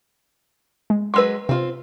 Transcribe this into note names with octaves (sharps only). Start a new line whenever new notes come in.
G#3
F#3 G#3 B4 C6 E6
C3 C4 F4